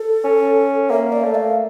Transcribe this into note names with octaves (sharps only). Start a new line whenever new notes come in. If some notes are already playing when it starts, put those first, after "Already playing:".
Already playing: A4
C#4
A#3 E5
D5
A3
F5